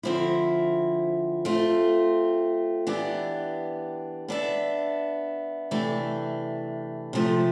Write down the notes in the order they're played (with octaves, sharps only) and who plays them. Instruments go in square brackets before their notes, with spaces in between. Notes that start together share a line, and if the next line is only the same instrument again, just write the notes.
[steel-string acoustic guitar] D3 F3 C4 E4
A3 C4 F4
E3 B3 D4 G4
B3 D4 A4 E5
C3 E3 A3 D4
C3 F3 A3